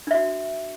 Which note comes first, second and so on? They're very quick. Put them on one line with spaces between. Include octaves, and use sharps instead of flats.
D4 E5 F#4